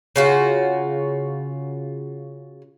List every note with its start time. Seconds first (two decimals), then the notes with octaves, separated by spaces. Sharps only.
0.16 C#3 F4 F#4